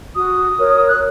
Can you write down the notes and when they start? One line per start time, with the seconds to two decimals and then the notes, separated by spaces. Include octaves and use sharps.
0.16 F#4 D#6
0.58 A#4 C#5
0.89 F#6